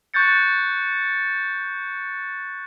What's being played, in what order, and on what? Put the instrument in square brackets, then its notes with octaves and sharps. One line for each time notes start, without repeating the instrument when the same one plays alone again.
[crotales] C#6 F#6 G6 A6 C#7